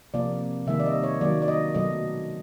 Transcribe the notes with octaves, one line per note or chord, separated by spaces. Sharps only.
C3 F3 A#3 D5
C3 D#3 G3 A#3 E5
D5
D#5
C#5
D#3 F#3 A#3 D5
D5
D#5
B2 F#3 A3 D#5